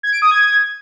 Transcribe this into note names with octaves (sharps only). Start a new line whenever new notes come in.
G#6
D7
D#6
G#6